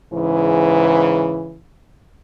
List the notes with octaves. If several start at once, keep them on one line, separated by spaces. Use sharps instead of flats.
G#2 C#3 E3